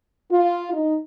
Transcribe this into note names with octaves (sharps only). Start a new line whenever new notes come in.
F4
D#4